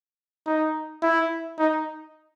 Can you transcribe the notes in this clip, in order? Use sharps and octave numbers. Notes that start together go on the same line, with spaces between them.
D#4
E4
D#4